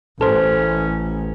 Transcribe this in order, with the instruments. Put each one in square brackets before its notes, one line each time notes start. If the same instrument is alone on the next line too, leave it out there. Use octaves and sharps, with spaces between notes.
[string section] A1 [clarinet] C#4 [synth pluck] A4 C5